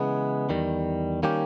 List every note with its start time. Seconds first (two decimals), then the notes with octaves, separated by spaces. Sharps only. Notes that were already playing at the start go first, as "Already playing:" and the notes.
Already playing: C#3 E3 G#3 B3
0.49 E2 D#3 G3
1.23 D#3 G3 A#3 C#4 G4